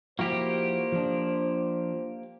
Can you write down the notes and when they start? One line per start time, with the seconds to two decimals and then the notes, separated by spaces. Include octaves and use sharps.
0.19 F3 A#3 E4 F#4 G4 C5
0.92 F3 D4